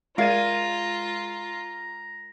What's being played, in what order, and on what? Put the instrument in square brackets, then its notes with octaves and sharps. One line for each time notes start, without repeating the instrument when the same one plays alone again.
[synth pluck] G#3 G#6 D#7 [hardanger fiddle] F4 [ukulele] A#4 D5 F5 [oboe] A#5